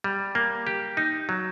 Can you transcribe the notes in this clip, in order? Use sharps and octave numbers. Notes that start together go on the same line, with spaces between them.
G3
A#3
G4
D#4
F#3